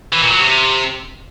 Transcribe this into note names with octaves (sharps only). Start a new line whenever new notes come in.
E3
A#2
F#3
C3